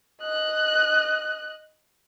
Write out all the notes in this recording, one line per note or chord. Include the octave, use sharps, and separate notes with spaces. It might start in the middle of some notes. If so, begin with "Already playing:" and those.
D#5 F#6